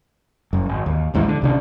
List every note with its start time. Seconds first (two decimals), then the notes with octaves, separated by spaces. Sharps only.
0.53 F#1 F#2
0.69 G#1
0.86 D#2
1.14 A1 D#2 G#2 E3
1.28 D3
1.42 C2 C#3 D4